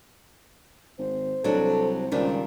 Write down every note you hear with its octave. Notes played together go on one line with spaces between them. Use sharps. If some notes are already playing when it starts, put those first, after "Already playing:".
G#1 C5
C2 F#3 D4 A4
C#2 A#2 D#3 G3 D4